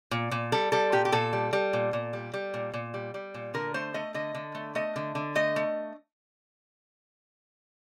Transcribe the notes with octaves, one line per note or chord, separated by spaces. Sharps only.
A#2
A#2
G3 A4
G3 A4
A#2 G4
G4
A#2 A4
G3
G3
A#2
A#2
G3
G3
A#2
A#2
G3
G3
A#2
D3 A#4
A3 C5
A3 D#5
D3 D#5
D3
A3
A3 D#5
D3
D3
A3 D#5
A3